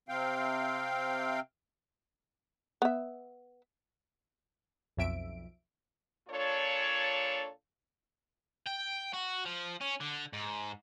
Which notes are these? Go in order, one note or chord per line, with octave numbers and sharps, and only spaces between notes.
C3 C4 F5 G5
B3 E5
B1 F2 E5 D7
A#2 D4 F4 A4 C#5
G5
F#4
F3
C#4
D3
G#2